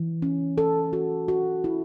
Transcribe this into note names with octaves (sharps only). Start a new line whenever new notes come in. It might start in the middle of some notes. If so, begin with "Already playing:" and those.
Already playing: E3
C#4
A4
F#4
F#4
E4